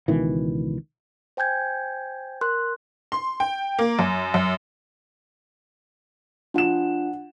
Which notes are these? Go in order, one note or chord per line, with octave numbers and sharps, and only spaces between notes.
C#2 B2 D#3 E3
C5 G5 G#5 G6 G#6
A#4 C6 F#6
C6
G5
A#3
F#2
F#2
F3 D4 F4 F#5 E7